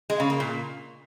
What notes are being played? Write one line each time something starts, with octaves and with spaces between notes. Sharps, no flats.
G#3
C#3
A#3
A#2